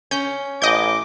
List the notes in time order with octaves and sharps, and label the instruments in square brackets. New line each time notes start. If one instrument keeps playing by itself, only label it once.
[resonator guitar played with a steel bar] C#4 [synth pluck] G6
[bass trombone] A1 [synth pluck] D#5 G6 [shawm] D6